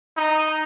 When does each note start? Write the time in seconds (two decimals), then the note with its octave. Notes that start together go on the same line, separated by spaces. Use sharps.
0.17 D#4